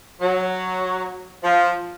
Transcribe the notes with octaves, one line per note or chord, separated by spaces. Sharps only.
F#3
F3